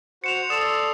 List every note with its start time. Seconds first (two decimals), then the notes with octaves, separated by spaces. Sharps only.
0.24 F#4 C5 C#7 E7 F7
0.50 A4 D5 C6 D#6 E7